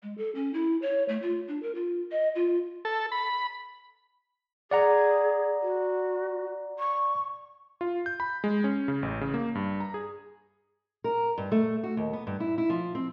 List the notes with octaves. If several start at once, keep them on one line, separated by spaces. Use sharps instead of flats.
G#3
A4
C#4
E4
C#5
A3
F4
D4
A#4
F4
D#5
F4
A4
B5
G#4 D5 F#5 A#5
F#4
C#6
F4
G6
B5
G#3
C#4
C#3
A1
C#3
A#3
G2
A#5
G#4
A#4
G2
A3
F#4
D#2
B3
G2
E4
E4
F3
C4